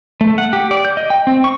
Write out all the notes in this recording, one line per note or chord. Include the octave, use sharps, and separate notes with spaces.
A3
F#5
G4
D5
G6
D#5
G5
C4
C#6